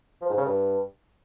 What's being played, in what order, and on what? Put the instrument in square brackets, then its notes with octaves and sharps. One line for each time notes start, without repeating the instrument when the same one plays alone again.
[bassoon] F3
G#2
C#3
G2